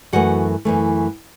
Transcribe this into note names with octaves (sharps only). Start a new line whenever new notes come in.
F#2 E3 A3 F#4 F#5
F#2 E3 A3